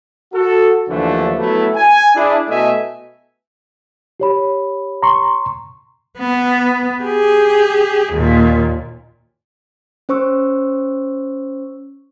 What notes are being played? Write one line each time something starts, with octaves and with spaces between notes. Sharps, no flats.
F#4 A4
D#2 D3 E3 F3 A3 D4
F#3 A3 B3 E4
G#5
D4 E4 G#4
B2 A3 E4 D#5 E5 G#5
G4 C#5 B5
A#5 C6 C#6
B3
G4 G#4
D#2 A#2
C#4 C5 C#6 E6